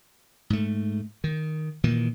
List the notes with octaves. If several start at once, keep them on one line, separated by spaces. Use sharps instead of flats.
G#2 A3
D#3
A#2 D#3 E3